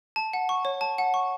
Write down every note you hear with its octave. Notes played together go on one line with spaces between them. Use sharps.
A5
F#5
C#6
C#5
A5
F#5
C#6